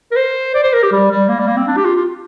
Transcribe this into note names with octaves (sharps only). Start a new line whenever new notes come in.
A#4
C5
D5
C5
A#4
G4
G3
G3
A#3
G3
A#3
C4
D4
G4
F4
F4